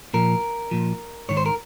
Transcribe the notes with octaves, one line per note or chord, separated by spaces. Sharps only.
A#2 F3 A#4
A#2 F3
G#2 D#3 C#5
C5
A#4